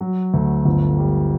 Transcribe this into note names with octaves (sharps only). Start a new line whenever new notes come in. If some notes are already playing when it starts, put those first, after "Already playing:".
F#3
D2
G1
G3